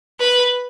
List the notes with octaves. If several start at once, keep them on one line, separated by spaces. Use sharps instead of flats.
B4